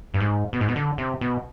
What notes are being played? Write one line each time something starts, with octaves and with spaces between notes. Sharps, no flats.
G2
G#2
B2
G#2
B2
D3
C3
B2